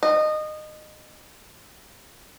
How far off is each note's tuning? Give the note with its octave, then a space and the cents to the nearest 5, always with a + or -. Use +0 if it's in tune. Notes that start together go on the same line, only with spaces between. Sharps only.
D#5 -20